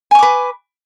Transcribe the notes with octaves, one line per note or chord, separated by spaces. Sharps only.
B4 G#5 C#6 D6